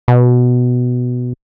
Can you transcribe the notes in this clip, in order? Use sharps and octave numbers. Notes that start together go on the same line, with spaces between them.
B2